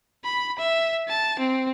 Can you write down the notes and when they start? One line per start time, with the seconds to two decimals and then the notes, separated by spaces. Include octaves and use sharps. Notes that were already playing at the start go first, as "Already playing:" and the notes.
0.24 B5
0.58 E5
1.08 A5
1.39 C4